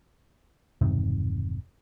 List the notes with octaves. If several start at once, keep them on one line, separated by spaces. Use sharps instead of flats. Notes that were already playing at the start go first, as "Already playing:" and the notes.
E1 G2 C3 D#3